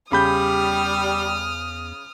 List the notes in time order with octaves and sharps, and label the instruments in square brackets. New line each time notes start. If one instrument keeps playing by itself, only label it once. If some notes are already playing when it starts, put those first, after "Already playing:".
[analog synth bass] E2 [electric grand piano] C#3 B5 G6 [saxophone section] G3 [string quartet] D#6 F6